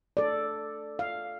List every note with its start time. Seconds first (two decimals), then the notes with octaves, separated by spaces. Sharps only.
0.17 A4 D5
0.99 F5